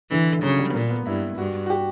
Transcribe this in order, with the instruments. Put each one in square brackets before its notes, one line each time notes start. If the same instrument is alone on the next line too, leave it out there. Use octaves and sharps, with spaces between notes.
[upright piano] D3 [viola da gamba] E3
[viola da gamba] C#3 [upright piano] F#3
[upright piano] G3
B3
[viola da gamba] A#2 [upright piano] A#3
[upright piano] B3
[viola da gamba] G2 [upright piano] E4
[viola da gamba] G2 [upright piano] F#4
[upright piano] F#4
G4